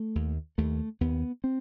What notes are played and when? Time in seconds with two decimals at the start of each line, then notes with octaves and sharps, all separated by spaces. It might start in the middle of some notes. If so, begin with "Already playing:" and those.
Already playing: A3
0.15 D#2
0.58 D#2 A3
1.01 D#2 B3
1.44 C4